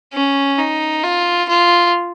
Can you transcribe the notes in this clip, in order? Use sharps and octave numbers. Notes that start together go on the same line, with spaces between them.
C#4
D#4
F4
F4